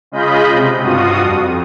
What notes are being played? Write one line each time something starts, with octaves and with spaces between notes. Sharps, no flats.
C#3 G#3 F4 D#5 B5 G6
C3
G2 F4 F#4 D#6
F2